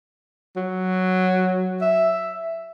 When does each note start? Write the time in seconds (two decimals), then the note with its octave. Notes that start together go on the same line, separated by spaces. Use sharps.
0.56 F#3
1.82 E5